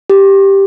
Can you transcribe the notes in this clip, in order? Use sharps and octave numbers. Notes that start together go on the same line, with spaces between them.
G4